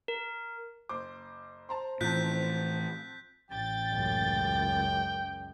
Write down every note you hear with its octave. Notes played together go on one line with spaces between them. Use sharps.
A#4
F#1 C5 D6
C5 A5 A#5 C6
A2 E3 F3 C4 A5 F#6 G6 B6
A1 G5 A6
C#2 F#2